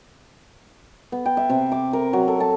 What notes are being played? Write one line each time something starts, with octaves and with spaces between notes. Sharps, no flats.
B3
G5
E5
C3
D6
A#4
F#3
A4
A5